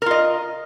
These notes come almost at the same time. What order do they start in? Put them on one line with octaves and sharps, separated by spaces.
A#4 F4 D#5